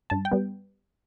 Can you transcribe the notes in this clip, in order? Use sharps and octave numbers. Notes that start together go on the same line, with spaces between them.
G2 A5
G5
G3 B3